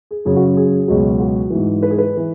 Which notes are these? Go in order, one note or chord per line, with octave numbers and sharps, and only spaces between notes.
G#4
F#2 C#3 F#3 G#4
F#4
G#4
C#2 B2 F#3
F#4
G#2 E3
B4
G#4
B4
E3